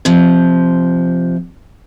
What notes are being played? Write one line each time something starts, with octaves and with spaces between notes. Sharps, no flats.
C3 F3